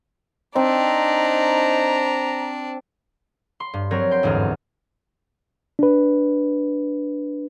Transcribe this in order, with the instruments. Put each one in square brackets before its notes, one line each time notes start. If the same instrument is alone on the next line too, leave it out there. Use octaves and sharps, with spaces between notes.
[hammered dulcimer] C4 [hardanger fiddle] D4 [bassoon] D#4 [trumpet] A#5
[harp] C6
G2
F#3 C4 A#4 C#5
G5 C6
G1 E2 G#2 G#4 F6
[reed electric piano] D4 B4